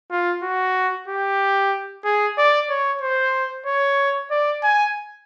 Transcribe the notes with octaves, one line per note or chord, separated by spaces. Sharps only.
F4
F#4
G4
G#4
D5
C#5
C5
C#5
D5
G#5